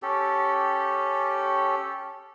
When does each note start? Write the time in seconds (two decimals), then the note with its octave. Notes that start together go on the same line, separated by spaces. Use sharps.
0.02 C#4 G4 A4